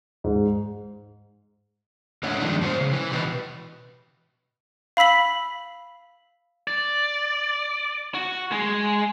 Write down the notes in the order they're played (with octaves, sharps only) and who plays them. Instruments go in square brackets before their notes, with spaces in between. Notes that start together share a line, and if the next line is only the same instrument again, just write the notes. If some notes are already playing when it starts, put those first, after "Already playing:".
[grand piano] G#2
[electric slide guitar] G#2 A3 D4 C#5 E5 F#5
G2 D#3 F3 G#3 D4 D#4
A2 F#4 B4 C5
C#3
E3
B2 F#4 G4 A#4 B4
[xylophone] F5 B5 E6 B6 F#7
[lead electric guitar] D5
F#4
G#3